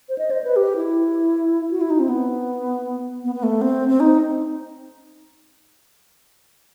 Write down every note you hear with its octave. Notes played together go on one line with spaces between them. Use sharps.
C5
D#5
C5
B4
G4
E4
F#4
E4
D#4
C4
B3
B3
B3
A3
C4
C4
D#4